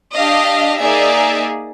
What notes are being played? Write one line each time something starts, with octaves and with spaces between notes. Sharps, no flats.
D4 G4 D#5 F5
A#3 D#4 G#4 D5 E5